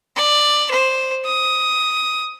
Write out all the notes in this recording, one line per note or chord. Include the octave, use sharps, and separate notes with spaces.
D5
C5
D#6